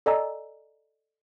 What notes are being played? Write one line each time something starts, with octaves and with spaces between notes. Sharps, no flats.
A4 D5 D#5 G#5 A#5 E6